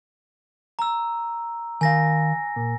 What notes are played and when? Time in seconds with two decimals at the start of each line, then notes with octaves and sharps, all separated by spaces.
0.79 A#5 E6
1.81 D#3 F5 G#5 A#6
2.56 A#2